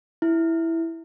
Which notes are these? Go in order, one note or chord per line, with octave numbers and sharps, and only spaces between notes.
E4